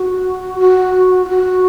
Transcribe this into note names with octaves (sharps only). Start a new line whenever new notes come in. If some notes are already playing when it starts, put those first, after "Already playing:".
Already playing: F#4
F#4
F4
F#4